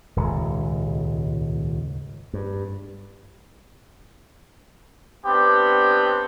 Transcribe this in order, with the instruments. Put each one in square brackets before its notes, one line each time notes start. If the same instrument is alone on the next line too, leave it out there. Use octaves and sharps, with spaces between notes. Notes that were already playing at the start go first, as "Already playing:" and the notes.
[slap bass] D#1 C#2 G#2 G#3
G2
[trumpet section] B3 C4 D4 G4